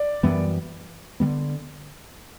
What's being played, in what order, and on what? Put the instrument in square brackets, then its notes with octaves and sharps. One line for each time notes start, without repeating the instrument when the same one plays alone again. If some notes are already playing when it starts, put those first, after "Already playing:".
Already playing: [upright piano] D5
[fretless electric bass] F#2 E3 G3 B3
D3 G3 B3